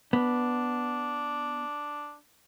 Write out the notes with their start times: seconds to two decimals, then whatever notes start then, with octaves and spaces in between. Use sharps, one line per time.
0.13 B3 D4